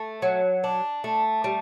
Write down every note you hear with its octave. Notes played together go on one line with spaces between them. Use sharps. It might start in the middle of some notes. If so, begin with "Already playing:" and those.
Already playing: A3
F#3
D4
A3
G3